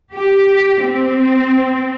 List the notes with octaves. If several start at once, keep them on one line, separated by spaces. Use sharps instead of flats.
G4
C4